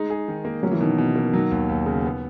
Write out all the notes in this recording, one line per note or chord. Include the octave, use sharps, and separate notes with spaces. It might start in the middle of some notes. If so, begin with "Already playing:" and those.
Already playing: G#3 D#4
G#4
D#3
A#3
F#3 C#4
E3
B2 D#3
B2
A#3
D#3 F#3
D#2
D#2
C#3
B3